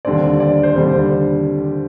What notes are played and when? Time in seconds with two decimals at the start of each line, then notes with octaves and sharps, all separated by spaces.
0.05 D#2 D3 G3 C4 D5
0.40 D5
0.63 C5
0.75 D#2 D3 G3 C4 D5
0.93 C5